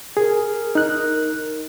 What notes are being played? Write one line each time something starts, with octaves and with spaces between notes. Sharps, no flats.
G#4 A#4
D#4 F#6